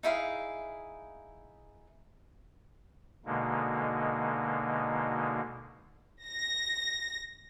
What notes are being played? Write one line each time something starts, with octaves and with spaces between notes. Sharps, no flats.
D#4 E4 G#4 F5
B2 D3 G#3 A#3 D#4
A#6